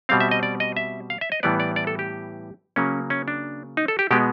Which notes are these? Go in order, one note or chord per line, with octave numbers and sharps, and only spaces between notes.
B2 G3 C4 F5
E5
D#5
D5
D#5
E5
F5
E5
D#5
A2 E3 G3 B3 D5
D5
D5
A4
G4
C#3 F#3 A#3 C#4
C#4
D4
D#4
A4
G4
B2 G#3 B3 G4